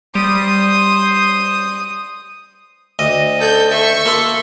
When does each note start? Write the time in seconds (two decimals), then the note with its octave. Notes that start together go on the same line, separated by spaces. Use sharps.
0.15 G3 C5 D#6
2.99 D2 D#5
3.39 A4 G6
3.71 E5 C#6
4.05 A#3 A4 C6